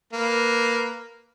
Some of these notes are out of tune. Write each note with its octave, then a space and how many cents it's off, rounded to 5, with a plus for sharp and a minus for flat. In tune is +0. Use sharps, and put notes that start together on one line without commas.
A#3 +0 B4 -10